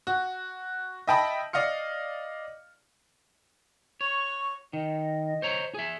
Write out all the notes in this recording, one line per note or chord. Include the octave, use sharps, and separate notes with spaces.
F#4
D#5 E5 G5 A5 B5 D#6
D5 D#5 F5 F6 C#7
C#5 C#6
D#3 D#5
C5 C#5 A#5
G#4 E5